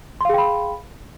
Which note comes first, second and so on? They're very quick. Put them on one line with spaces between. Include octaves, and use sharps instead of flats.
C6 F5 G#4 G5 B5